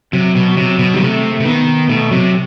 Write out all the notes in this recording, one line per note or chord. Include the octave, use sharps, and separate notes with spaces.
C3 F#3
B2
C3 F#3
B2
D#3 G3
C3 A3
A3
C3
D#3 B3
B2 A3
C3 F#3